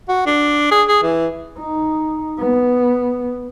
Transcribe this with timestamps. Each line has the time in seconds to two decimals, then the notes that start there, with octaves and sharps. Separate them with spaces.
0.08 F#4
0.26 D4
0.71 G#4
0.88 G#4
1.03 E3
1.59 D#4
2.39 B3